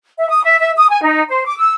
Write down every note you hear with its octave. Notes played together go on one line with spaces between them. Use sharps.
E5
D#6
E5
E5
D#6
G#5
D#4
C5
D6
E6